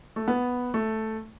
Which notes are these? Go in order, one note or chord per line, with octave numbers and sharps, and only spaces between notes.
A3
B3
A3